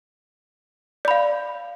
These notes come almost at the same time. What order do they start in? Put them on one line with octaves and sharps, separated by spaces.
D5 B5 F5